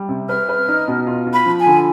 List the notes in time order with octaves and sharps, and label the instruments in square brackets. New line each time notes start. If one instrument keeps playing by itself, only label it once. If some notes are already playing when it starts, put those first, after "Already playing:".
Already playing: [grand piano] G3
C3
[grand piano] B4 [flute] F6
[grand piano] B4
D#4
B2
F4
F4
[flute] B5
[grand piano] F3
[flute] G#5
[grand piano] D3